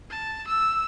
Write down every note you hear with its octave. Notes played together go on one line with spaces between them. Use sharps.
A5
E6